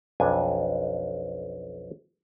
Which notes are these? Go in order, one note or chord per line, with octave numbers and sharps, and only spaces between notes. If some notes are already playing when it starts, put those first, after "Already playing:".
B1 F2 D4 G#5